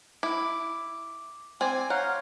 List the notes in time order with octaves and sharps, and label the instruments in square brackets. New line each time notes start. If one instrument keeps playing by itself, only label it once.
[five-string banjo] E4 [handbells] D6
[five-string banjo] C4 D5 [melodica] G#5
[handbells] C#5 A#5 G6 [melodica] F5 [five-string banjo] F#5